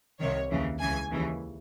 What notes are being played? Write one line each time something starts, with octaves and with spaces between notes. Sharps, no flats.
C2 C3 D#3 C#5
D#2 C#3 E3
C#2 C#3 E3 G#5
D#2 C#3 E3